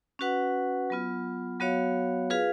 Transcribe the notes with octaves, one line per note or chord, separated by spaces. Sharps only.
C#4 F#4 B4 F#5
F#3 B3 F4
F#3 B3 F#4 C#5 F5
F4 G#4 B4 F5